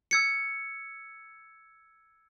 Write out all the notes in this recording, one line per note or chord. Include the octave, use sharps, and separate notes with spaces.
E6 G#6 C#7